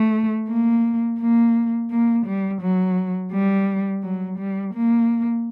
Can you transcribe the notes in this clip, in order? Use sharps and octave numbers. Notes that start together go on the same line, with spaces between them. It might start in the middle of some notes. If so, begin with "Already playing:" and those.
Already playing: A3
A#3
A#3
A#3
G3
F#3
G3
F#3
G3
A#3